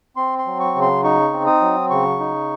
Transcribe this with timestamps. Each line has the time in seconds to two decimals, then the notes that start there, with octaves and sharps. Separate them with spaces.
0.17 C4 C6
0.39 C6
0.46 F#3
0.60 C#6
0.75 C#3
0.82 C6
1.04 D#4 C#6
1.33 C4
1.47 D#6
1.61 F#3
1.90 C#3 C#6
2.19 D#4